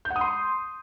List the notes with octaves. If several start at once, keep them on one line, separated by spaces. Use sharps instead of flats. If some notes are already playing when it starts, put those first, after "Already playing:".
G6
F#5
D#6
C6